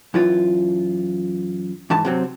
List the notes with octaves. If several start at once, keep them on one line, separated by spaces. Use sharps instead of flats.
F#2 E3 F4
G#2 E3 A5
C3 F#3 C4